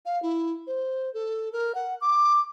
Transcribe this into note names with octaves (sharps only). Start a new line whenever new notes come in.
F5
E4
C5
A4
A#4
F#5
D6